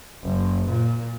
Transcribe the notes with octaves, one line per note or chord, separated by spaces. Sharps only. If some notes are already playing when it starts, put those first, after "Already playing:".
F#1
A#2